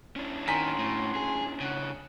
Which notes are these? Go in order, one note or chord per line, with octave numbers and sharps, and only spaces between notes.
C#4 D4 E4
D#3 F#4 G#5 A#5 C6 B6
A2
G#4
C#3 F#5